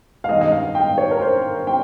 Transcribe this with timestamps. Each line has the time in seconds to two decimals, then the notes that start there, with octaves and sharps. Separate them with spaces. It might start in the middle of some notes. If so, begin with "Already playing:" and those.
0.24 F5
0.29 G2 D#3 G#3 D#5
0.41 D#5
0.52 F5
0.75 G5
0.98 C#5
1.11 A#4
1.21 C5
1.67 G5